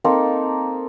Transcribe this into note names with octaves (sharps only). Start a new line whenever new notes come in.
A#3 C4 D#4 A4